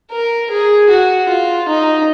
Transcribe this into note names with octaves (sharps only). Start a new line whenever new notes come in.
A#4
G#4
F#4
F4
D#4